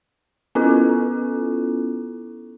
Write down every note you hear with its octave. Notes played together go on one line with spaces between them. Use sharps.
B3 C#4 E4 F4 A4